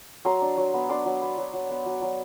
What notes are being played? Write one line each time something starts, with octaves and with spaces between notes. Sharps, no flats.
F#3 A#5 C6
D4
F#3
B3
D4 C6 D6
F#3
B3
F#3
F#3
B3
F#3
F#3